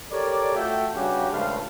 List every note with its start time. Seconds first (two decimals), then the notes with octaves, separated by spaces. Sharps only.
0.12 G4 A4 A#4 C#5 D5
0.55 A3 F4 F#4 A4 E5 G5
0.94 G2 C#3 C#4 F#4 G4
1.31 C#2 G2 F3 A3 B4 F5